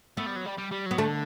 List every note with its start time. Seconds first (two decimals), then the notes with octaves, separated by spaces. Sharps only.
0.17 A3 B3
0.26 G3
0.36 F#3
0.45 G3
0.58 G3
0.71 G3
0.86 F#3
0.91 B3
0.98 D3 A3